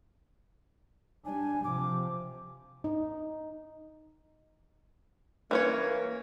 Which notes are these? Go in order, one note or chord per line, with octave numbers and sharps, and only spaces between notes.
G3 D4 G#5
C3 F3 D6
D#4
E3 A#3 C#4 C#5